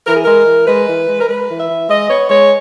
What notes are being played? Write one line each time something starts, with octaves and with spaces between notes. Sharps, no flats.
E3 A#4
G#4
G#3 A#4
E3
G#3 B4
E3
G#3
A#4
G#3 B4
E3
E5
E3
G#3 D#5
B3 C#5
G#3 C#5